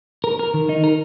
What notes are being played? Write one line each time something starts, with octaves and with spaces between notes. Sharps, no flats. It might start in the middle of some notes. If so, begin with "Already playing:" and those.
A#4
A#4
D#3
D#4
A#4